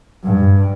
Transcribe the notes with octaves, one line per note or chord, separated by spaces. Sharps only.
G2